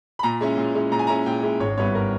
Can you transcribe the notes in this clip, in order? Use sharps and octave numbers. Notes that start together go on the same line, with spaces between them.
B5
A#2 A#5
G#3 C#4 E4
A#2
G#3 C#4 E4
A#2 A#5
G#5
G#3 C#4 E4 A#5
A#2 G5
G#3 C#4 E4
G#1 C#5
G2 G3 B3 E4 C#5
A#4